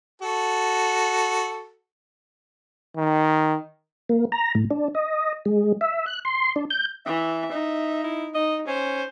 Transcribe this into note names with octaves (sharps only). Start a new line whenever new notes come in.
F#4 A4
D#3
A#3
A#5
A2
D4
D#5
G#3
E5
F#6
C6
D4
G6
E3 E5
D#4
E4
D#4 D#5
C#4 C5